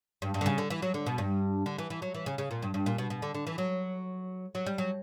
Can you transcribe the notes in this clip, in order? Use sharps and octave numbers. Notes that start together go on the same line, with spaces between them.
G2
G2
D3
C#3
D3
E3
F#3
D3
B2
G2
D3
E3
E3
F#3
E3
C#3
C#3
A#2
G2
G2
A#2
B2
B2
D3
D3
E3
F#3
F#3
G3
F#3